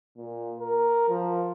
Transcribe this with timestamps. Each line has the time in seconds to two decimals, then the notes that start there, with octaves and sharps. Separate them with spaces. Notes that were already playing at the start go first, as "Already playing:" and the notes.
0.17 A#2
0.60 A#4
1.09 F3